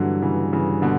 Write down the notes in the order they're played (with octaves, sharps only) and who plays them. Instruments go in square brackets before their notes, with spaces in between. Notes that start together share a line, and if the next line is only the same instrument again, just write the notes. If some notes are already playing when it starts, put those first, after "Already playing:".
Already playing: [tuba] G2 [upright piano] D3 E3 F#3
[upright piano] C#3 E3
C#3 E3
B2 D3